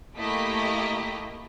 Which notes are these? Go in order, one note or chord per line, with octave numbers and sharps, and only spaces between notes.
A3 A#3 E4 G4 D#5 B6